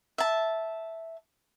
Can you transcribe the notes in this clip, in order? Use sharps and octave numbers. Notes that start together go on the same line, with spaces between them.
E5 A5